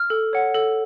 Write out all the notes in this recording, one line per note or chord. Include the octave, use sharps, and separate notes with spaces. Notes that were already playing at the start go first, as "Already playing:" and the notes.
Already playing: F6
A4
C#5 F#5
A4